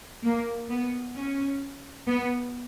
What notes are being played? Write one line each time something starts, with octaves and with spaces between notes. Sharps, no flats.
A#3
B3
C#4
B3